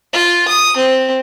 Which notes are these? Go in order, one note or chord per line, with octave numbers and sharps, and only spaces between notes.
F4
D#6
C4